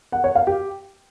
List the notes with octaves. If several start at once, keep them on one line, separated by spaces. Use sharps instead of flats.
F#5
C#5
F5
G4